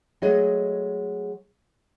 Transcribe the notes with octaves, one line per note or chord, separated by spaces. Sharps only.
F#3 G#3 A3 G#4 D#5